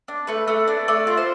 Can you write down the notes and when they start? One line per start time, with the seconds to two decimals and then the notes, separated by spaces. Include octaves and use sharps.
0.08 D4
0.27 A3 B4
0.48 A3
0.68 D4
0.88 A3 D5
1.07 F4
1.17 C5